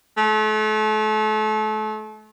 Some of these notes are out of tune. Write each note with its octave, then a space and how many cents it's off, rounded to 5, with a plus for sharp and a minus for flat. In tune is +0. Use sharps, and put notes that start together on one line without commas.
A3 -35